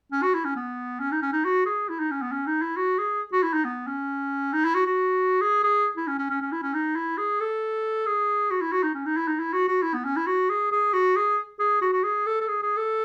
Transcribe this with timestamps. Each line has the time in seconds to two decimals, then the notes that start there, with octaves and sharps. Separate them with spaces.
0.12 C#4
0.23 F#4
0.34 E4
0.45 C#4
0.56 B3
1.00 C#4
1.12 D#4
1.22 C#4
1.33 D#4
1.45 F#4
1.66 G#4
1.89 E4
2.00 D#4
2.11 C#4
2.22 B3
2.32 C#4
2.47 D#4
2.62 E4
2.77 F#4
2.98 G#4
3.32 F#4
3.43 E4
3.54 D#4
3.65 B3
3.87 C#4
4.53 D#4
4.65 E4
4.75 F#4
4.86 F#4
5.41 G#4
5.64 G#4
5.97 E4
6.08 C#4
6.19 C#4
6.30 C#4
6.42 C#4
6.52 E4
6.63 C#4
6.74 D#4
6.96 E4
7.18 G#4
7.40 A4
8.06 G#4
8.51 F#4
8.61 E4
8.72 F#4
8.83 D#4
8.94 C#4
9.06 D#4
9.17 E4
9.28 D#4
9.40 E4
9.53 F#4
9.68 F#4
9.83 E4
9.94 B3
10.05 C#4
10.17 E4
10.27 F#4
10.50 G#4
10.72 G#4
10.93 F#4
11.16 G#4
11.60 G#4
11.82 F#4
11.93 F#4
12.04 G#4
12.27 A4
12.41 A4
12.48 G#4
12.63 G#4
12.77 A4